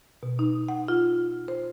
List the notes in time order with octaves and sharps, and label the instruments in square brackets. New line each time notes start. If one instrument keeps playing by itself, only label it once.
[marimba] B2
D#4
F#5
F4
C5